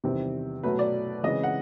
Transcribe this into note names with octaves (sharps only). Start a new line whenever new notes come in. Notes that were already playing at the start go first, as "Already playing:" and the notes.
E2 C3 D#3 G3 C4
B2 F#3 A3 B4
D5
C#3 E3 G#3 C4 D#5
F#5